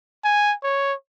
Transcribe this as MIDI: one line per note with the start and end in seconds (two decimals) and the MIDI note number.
0.24 0.54 80
0.63 0.94 73